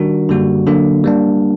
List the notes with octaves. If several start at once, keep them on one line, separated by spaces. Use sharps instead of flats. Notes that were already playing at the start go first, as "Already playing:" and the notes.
Already playing: D#3 G3 D4 F#4 A#4
F#2 D3 G3 A#3 F#4
D3 F#3 A#3 D4
G3 A#3 D4